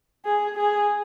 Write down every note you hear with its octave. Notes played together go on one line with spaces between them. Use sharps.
G#4
G#4